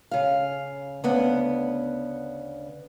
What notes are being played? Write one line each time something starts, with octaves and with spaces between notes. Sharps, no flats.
C#3 F5
D2 C#3 B3 F#5